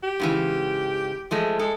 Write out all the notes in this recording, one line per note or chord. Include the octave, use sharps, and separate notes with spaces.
G4
G#2 C#3 E3
F3 G#3 A3
G#3 A4